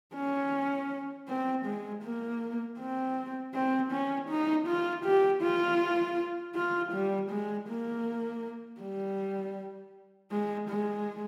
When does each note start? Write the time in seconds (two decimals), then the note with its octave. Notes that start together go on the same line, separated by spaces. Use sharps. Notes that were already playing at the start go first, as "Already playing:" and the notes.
0.15 C#4
1.28 C4
1.66 G#3
2.04 A#3
2.79 C4
3.54 C4
3.92 C#4
4.29 D#4
4.67 F4
5.04 G4
5.42 F4
6.55 F4
6.92 G3
7.30 G#3
7.68 A#3
8.81 G3
10.31 G#3
10.69 G#3